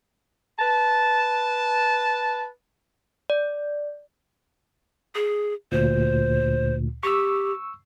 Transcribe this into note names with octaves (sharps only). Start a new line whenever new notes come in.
B4 A5
D5
G#4
D2 A#2 C5
G4 C#6 E6